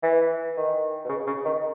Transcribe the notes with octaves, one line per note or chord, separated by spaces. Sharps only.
E3
D#3
B2
C#3
C#3
D#3